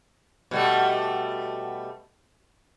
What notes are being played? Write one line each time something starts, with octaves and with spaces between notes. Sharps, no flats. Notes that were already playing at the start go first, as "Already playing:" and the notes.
B2 G3 A3